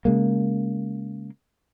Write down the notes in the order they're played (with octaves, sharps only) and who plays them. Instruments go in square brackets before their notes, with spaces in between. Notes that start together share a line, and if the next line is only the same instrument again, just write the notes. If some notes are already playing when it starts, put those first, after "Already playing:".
[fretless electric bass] C#3 G#3 A#3